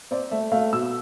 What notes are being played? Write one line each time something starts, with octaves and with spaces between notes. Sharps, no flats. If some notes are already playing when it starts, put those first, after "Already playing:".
C4 D5
A3 E5
A3 F5
B2 E6